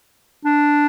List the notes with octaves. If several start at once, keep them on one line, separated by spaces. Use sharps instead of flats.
D4